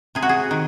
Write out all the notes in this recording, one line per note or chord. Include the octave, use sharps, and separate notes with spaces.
C3 G#4
F#4
G#4
D#3